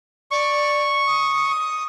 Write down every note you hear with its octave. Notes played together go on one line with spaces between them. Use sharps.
D5 C#6
D#6